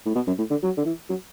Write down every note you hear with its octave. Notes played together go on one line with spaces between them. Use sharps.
A2
B2
F#2
A2
D3
F#3
D3
E3
F#3